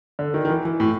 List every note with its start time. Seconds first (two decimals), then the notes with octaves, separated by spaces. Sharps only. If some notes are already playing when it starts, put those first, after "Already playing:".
0.19 D3
0.34 D#3
0.45 D#3
0.50 E3
0.65 E3
0.80 A2